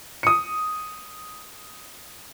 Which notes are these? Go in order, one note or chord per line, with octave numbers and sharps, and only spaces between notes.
D#6 C#7